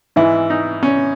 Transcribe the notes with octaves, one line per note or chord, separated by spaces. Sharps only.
G#2 E3 E4
D#4
C#4